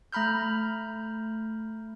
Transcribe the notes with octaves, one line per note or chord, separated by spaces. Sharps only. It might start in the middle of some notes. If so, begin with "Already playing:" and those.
A3 A#5 B5 F6 G6